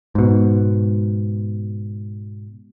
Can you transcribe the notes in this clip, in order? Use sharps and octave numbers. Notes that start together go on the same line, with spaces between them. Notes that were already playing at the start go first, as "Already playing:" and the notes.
G#2 B2